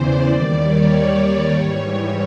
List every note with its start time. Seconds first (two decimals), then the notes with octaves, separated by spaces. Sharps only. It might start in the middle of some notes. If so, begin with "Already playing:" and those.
Already playing: E2 C#3 E3 C5 D5
0.25 D#2 D#3 G3
0.56 C#5
1.52 G#2 E3 G3